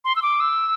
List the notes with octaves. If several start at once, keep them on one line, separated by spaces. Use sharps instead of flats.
C6
E6
D6
E6